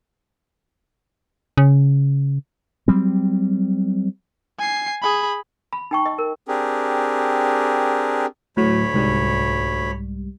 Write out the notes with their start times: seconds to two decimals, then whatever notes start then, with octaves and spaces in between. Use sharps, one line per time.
1.57 C#3
2.88 F#3 G3 C4
4.59 G#5 C7
5.02 G#4 B5
5.73 B5
5.91 D#4 G5 C#6
6.06 D#5
6.18 A#4
6.48 C4 D4 G4 G#4 A#4
8.57 D2 A2 F#3 C#5 B5
8.94 C2 G#2 G3